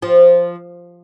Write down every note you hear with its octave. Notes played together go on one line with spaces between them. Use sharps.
F3